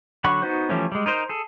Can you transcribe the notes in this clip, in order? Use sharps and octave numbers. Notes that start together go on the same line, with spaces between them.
D3 F#3 F#5 B5 C#6
B3 D#4 F#4 C5
E3 F3 G3 A3 C#4
G3 G#3
D#4 A#4 C5
G#4 A4